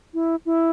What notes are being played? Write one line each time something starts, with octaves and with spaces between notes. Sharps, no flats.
E4
E4